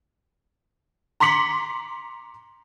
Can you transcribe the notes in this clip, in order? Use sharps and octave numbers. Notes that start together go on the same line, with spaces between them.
A#5 C6 D6 B6 C#7 F#7